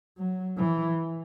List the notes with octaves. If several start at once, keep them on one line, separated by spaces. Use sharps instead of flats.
F#3
E3